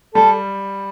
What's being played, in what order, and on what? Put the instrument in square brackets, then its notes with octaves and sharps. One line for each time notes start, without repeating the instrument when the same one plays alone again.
[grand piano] G3 [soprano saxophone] A4